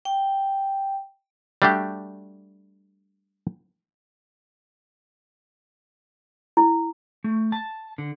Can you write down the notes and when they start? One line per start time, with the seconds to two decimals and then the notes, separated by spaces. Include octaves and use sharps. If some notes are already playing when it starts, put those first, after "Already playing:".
0.05 G5
1.62 G3 A3 D4 F#4 G4
6.57 E4
7.24 A3
7.52 A5
7.98 D3